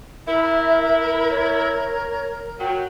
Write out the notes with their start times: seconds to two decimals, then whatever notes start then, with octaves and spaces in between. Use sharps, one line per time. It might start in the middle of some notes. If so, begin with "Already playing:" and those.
0.27 E4 A#4 E5
1.30 C#5
2.60 F#3 G5